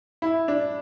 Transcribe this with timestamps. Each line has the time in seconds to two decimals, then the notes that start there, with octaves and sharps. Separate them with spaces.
0.22 E4
0.48 D4